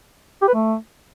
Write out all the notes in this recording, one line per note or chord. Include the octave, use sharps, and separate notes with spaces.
G4
B4
A3